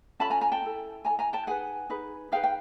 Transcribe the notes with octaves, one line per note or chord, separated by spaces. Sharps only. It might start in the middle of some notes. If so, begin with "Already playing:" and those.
C#4 F4 A4 A5 B5
G#5 A#5
G#5 A#5
G5 A5
E4 A4
E4 A4 G#5 A#5
G#5 A#5
G5 A5
D#4 G#4 B4 F#5 G#5
D#4 G#4 B4
D#4 G#4 B4 F5 G5
G5